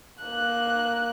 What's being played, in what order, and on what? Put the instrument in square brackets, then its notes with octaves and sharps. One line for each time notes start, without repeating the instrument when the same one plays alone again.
[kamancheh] A#3 F#6